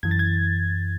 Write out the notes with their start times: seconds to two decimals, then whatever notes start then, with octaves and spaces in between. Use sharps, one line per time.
0.03 F#2 E3 G#6
0.11 A6
0.19 G#6